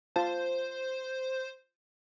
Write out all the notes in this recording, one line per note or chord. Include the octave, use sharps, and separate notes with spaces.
F4 C5 A5